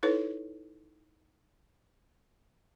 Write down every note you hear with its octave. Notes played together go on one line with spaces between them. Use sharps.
D#4 E4 A4 B4 C#5